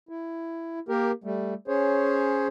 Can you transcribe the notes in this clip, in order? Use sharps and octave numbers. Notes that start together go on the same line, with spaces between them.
E4
A#3 G4 A#4
G3 A3
C#4 G#4 C5 C#5